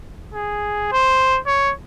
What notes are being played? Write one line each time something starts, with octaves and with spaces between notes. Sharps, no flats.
G#4
C5
C#5